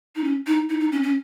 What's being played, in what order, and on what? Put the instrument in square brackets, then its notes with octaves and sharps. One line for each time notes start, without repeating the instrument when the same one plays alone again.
[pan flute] D#4
C#4
D#4
D#4
D#4
C#4
C#4